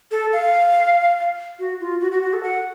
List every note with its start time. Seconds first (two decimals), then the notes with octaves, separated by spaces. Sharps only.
0.11 A4
0.33 F5
1.59 F#4
1.80 F4
2.01 F#4
2.12 F#4
2.23 F#4
2.33 A4
2.43 F#5